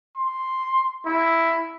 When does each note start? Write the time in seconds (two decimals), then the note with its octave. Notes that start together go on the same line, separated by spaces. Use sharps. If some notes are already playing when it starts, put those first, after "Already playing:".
0.16 C6
1.05 E4